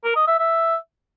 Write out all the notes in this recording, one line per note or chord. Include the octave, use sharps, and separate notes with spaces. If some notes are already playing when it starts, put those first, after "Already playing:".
A#4
D#5
E5
E5